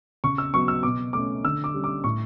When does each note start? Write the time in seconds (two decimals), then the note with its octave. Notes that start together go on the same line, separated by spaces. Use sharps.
0.24 C#3 C#6
0.38 E6
0.54 F#3 B3 C#6
0.68 E6
0.83 B2 D6
1.13 A3 C#4 D6
1.44 D3 E6
1.64 D6
1.74 G3 C#4
1.84 D6
2.04 A2 C#6